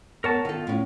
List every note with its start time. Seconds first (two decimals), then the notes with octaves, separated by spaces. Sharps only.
0.24 B3 A#4 C#5 A5
0.45 D#3 F4 A4
0.67 A2 C#4